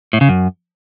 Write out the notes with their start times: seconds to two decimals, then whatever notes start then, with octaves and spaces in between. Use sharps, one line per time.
0.13 A2
0.21 C#3
0.29 F#2